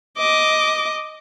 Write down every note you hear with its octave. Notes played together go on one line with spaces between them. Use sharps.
D#5 D6